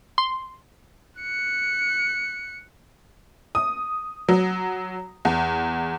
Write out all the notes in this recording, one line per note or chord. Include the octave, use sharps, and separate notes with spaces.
C6
F#6 C#7
D#6
F#3
E2